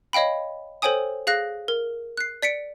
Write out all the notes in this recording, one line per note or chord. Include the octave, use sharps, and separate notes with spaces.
C#5 D#5 F5 G5 B5
A4 C5 C#5 G5 G#5 D#6
G#4 F5 F#6 A#6
A#4
F#6 C7
D5 B6 C#7 D7